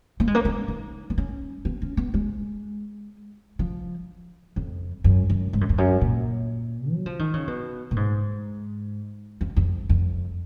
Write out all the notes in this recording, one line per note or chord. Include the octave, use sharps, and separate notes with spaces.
A#3
G#3
A#3
C#4
D#4
B3
C#4
B3
C#4
B3
G#3
F3
F2
F#2
F#2
G#2
F#2
F2
F#2
A#2
F#3
F3
D#3
C#3
B2
A#2
G#2
F2
F2
F2